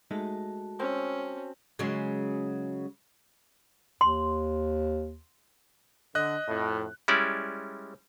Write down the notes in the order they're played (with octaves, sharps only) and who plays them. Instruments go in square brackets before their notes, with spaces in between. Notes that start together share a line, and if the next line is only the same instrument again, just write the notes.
[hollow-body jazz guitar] G#3 A3 D#4 [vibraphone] F#4 A5
[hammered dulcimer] C4 [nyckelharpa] C#4
[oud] C#3 F#3 G#3
[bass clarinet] D#2 [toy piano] C6
[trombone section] D3 [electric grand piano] D#5 F#6
[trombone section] F2 A2
[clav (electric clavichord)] G3 G#3 C#4 E4 D5